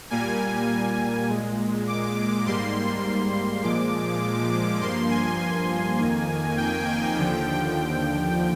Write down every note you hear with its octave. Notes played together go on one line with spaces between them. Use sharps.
A#2 G3 A#3 G#5
A#2 G#3
D6
G#2 G3 A#3 C6
A#2 F3 G#3 D6
G2 F3 A#3 C6
G#5
G#5
F2 D#3 A#3
G5
D#2 D3 F3